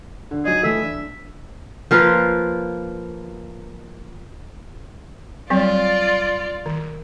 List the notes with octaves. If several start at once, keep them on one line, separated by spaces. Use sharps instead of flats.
D3
F#3 D#4 G#4 D#5
E3 A3 E5
D4
F3 A#3 F4 B4
F#3 G3 C4 F4 D5
D#3